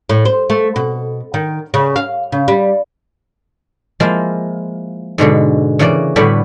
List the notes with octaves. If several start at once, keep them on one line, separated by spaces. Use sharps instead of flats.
A2
C5
A3
B2
D#3
C#3
F5
C#3
G3
F3 G#3 A#3 E4 F4
G#2 B2 D3 G#3
C#3 E3 A#3 D5
A2 D3 G3 B3 D4 F#4